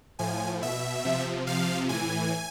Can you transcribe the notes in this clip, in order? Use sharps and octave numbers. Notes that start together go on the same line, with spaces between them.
A2 F3 G#5
B2 E5
C3 F3
C3 F3 F5
A2 E3 G#5